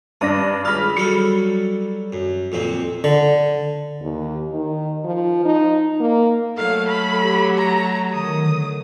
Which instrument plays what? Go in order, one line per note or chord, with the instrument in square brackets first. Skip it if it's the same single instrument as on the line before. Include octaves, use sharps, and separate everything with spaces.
[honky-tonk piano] G2 D4 A#6 [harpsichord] D#6
[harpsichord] C#2 A5 [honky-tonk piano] B5 F6
[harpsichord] F#3 G3 A4 [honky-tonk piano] C#7
[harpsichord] F#2
F2 A#2 C4
D3
[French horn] D#2
D#3
F3
D#4
A#3
[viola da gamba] F#3 A3 [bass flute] A4 [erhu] F5
[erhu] B5
[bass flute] G4
[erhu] A#5
[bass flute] D#3 [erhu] D#6
[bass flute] D3